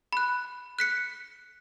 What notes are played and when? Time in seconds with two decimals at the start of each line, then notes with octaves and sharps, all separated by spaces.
0.13 B5 F#6
0.79 F#6 B6 C#7